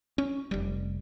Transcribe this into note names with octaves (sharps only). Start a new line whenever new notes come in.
C#4
F1 G3